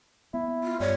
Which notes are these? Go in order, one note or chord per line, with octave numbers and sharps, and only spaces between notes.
B3 E4
F4
G2 G3 C#5